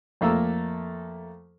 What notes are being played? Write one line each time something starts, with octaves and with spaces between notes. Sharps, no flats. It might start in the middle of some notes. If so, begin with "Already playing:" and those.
F2 A3 A#3 A#5 E6